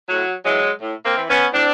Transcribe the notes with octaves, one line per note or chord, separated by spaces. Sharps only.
A2 F#3
E3 F#3 G#3
A2
A#3 C4
E3
B3 C#4
A2 C4 D4